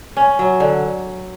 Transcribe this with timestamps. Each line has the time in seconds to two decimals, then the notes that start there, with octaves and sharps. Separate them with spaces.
0.17 C#4
0.39 F#3
0.60 D3